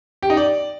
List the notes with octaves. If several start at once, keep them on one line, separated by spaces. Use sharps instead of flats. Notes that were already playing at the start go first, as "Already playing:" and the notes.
G4
D#4
D5